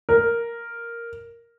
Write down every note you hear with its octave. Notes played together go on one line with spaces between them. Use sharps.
A#4